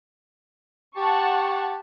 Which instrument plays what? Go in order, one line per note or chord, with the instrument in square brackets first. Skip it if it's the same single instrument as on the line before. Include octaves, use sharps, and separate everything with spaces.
[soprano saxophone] G4 [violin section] F#5 A5 C#6